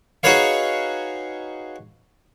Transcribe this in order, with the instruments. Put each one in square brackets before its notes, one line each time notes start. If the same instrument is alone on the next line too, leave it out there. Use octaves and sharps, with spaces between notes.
[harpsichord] D#4 F#4 G#4 B4 C#5 F5